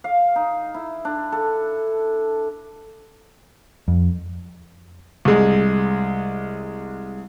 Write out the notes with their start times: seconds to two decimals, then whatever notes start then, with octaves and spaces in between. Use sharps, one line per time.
0.04 F5
0.36 D#4
0.74 E4
1.05 D4
1.32 A4
3.88 F2
5.25 C2 G#3